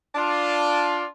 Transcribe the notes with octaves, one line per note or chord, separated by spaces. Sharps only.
D4 F4